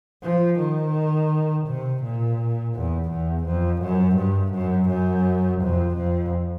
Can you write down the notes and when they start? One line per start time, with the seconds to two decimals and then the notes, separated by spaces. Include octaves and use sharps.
0.23 F3
0.59 D#3
1.67 C3
2.03 A#2
2.74 E2
3.10 E2
3.45 F2
3.82 F#2
4.17 G2
4.54 F#2
4.89 F#2
5.61 F2
5.97 F2